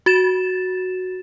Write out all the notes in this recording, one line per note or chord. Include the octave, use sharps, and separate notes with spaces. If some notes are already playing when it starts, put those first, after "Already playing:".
F#4 A6 E7